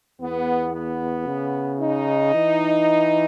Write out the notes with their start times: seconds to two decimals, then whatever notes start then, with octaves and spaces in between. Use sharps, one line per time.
0.21 E2 B3
0.74 B3
1.27 C#3
1.80 D#4
2.34 E3